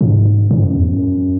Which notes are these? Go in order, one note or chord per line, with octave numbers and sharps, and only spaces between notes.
A2
G#2
G#2
F#2
E2
F#2